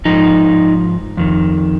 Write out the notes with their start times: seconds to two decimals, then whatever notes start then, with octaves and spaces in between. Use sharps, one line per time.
0.05 G#2 F3 D#4
1.17 F2 D#3